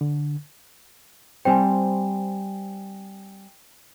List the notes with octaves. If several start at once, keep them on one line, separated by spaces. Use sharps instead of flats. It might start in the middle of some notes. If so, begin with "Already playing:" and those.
D3
G3 C4 C5 G5 G#5